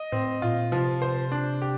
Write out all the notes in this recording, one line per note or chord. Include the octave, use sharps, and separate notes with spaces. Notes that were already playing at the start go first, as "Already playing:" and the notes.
Already playing: D#5
A2 C4
A#2 F4
C3 F3
C5
D4
G4